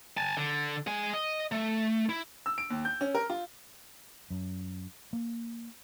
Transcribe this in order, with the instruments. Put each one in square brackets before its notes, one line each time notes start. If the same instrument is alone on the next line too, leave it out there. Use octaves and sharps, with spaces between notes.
[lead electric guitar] G#5 A5
D3
G#3 G#5
D#5
A3
E4
[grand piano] E6
D7
D#2
G6
C#4
A#4
F4
[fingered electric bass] F#2
A#3